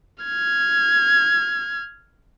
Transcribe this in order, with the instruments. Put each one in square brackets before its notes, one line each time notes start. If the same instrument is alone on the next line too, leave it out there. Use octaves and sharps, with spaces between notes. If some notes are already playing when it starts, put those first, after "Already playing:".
[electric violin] F6 G#6